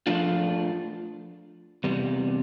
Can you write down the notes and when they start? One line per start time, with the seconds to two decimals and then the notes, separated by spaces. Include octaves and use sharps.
0.07 F3 A3 D4 F4
1.84 E2 C3 G3